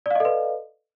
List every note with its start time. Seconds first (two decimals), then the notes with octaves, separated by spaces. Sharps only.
0.06 D5
0.11 F5
0.15 D#5
0.20 A4
0.25 B4